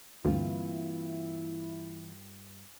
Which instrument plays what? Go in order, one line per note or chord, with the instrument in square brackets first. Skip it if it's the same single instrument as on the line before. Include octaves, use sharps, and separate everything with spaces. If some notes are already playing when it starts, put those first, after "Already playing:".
[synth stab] D2 [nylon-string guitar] G2 F4 [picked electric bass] E3 A#3 C4 [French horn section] E4